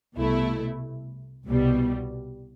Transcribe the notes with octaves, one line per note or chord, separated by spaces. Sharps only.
C2 B2 A3 E4
C2 B2 G3